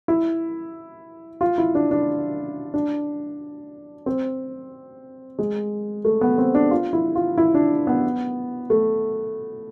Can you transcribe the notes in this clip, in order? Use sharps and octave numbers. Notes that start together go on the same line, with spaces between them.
E4
F4
E4
D4
D4
D4
C4
G#3
A3
B3
C4
D4
F4
E4
F4
E4
D4
B3
A3